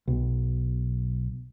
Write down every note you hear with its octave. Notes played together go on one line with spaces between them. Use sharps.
B1